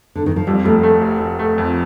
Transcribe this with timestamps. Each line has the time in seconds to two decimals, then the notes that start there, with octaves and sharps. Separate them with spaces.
0.15 D3
0.26 D#3
0.36 F3
0.47 F2 G3
0.65 F1 A3
0.83 A3
1.02 F1
1.20 F1
1.39 A3
1.58 F2